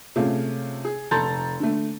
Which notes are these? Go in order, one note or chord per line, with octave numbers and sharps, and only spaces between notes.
C3 A3 C#4 F4 G#4
G#4
F1 A4 A#5 C6 G6 A6
D3 A3